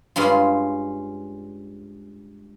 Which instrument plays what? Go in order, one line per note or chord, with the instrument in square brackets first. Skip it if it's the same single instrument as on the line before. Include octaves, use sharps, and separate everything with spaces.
[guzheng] G2 G#3 C#4 F4